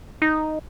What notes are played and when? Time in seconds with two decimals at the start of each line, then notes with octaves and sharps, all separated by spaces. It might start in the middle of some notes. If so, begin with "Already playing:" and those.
0.22 D#4